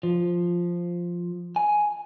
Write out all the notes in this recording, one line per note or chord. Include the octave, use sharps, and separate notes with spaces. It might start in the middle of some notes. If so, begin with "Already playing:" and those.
F3
G#5